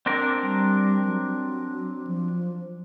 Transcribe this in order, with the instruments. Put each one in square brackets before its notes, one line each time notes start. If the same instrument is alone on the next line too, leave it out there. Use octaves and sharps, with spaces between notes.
[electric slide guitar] C4 D4 A#4
[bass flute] G3
F#3
F3